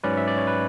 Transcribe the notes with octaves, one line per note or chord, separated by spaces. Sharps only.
G#2 F#3 C#4 B4 D5
E5
D5
C#5
B4